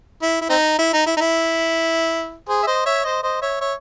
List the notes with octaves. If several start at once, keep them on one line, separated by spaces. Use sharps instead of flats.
E4
E4
C4 D#4
E4
D#4
E4
D#4
E4
G#4 C5
E5
C5 D#5
C#5 E5
C5 D#5
C5 D#5
C#5 E5
C#5 E5